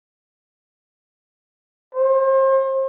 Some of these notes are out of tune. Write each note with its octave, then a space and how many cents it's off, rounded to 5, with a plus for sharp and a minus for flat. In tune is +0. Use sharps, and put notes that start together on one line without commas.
C5 +35